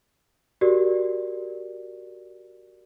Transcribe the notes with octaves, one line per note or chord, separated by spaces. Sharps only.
F#4 G4 A#4 D5